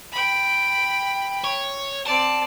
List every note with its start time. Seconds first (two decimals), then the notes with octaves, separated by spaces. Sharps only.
0.12 G5 B5
1.44 C#5
2.06 C4 D5 A5